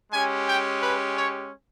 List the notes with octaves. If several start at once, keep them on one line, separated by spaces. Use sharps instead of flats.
G#3 C#4 G4 G#5
G5
B4
C#5